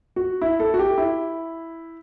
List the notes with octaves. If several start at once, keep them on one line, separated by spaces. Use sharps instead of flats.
F#4
E4
A4
F#4
G4
E4